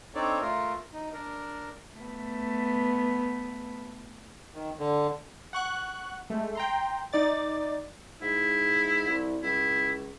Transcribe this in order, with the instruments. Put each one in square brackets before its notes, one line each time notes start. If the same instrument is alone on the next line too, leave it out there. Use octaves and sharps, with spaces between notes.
[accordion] C4 D4 D#4 A4 C#5 D5
A3 F4 A#4
D#4
D4 A#4
[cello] A3 B3
[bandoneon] D#3
D3
[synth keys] F#5 C#6 F#6
G#3 A3
G5 A#5 C6
D#4 D5 A6
[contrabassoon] G#2 [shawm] E4
[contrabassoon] C2
[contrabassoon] C#2 [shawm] E4